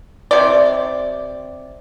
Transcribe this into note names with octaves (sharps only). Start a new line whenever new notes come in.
C3 D5